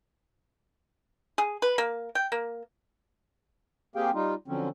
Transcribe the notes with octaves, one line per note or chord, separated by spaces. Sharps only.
G#4
B4
A#3
G5
A#3
A#3 C4 G4 G#4 F5 G5
G3 D#4 F4
D3 F3 F#3 C4 C#4